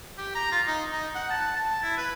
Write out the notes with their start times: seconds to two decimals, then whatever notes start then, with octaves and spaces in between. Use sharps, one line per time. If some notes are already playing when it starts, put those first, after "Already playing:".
0.18 G4
0.35 A#5
0.52 F4
0.67 D#4
0.92 D#4
1.15 F#5
1.30 A5
1.56 A5
1.83 E4
1.97 B4